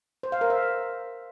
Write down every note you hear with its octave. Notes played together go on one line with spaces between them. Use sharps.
C5
F5
A#4
E5